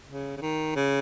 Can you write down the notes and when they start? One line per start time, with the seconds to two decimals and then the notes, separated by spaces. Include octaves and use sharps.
0.09 C#3
0.37 C#3
0.41 D#3
0.76 C#3